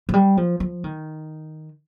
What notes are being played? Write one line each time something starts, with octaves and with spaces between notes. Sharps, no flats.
F3
G3
F3
F3
D#3